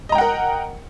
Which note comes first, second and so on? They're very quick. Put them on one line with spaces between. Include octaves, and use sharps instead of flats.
D#5 A#5 G5 F#5 A#4